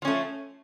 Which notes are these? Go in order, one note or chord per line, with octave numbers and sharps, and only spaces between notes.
F3 A3 C#4